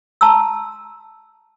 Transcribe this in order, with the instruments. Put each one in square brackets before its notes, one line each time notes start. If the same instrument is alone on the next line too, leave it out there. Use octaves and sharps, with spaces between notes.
[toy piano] A5 A#5 C6 E6